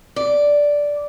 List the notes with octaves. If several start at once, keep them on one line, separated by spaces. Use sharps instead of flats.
D5